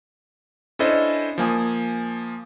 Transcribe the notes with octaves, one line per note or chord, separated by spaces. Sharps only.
C#4 D4 E4 A4 C5 D#5
F3 A#3 G#5 D#6